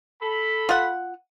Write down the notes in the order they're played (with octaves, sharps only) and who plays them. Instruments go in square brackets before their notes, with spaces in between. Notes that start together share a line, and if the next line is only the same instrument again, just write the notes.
[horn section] A4 B5
[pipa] F4 F#5